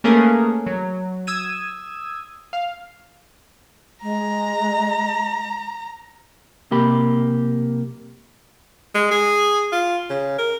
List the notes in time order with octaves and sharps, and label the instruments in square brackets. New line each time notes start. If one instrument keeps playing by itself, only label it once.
[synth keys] A3 A#3 C#4 G#4 A#4 B4
F#3
D#6 E6 G#6 D#7
F5
[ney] G#3 [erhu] A#5
[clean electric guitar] B1 C3 A#3 G4 B5
[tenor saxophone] G#3
G#4
F4
C#3
A#4